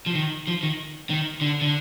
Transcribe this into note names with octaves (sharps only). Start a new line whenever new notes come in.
F3
D#3
F3
D#3
D#3
D3
D3